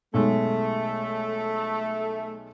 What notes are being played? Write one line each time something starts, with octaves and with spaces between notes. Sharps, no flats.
B1 G#3 A3